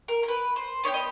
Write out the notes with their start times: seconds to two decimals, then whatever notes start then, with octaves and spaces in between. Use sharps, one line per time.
0.08 A#4
0.23 A#4
0.28 B4
0.56 C5
0.84 B3 E4 G4 C#5
0.94 D#5